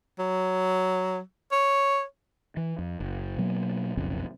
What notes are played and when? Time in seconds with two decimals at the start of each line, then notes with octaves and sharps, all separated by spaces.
0.19 F#3
1.52 C#5
2.57 E3
2.79 F2
3.00 F#1
3.38 B2 F#3 A#3
3.97 F1 B1 F2 C#3